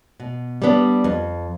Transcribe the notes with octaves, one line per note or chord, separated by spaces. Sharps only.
B2
G3 B3 D4
F2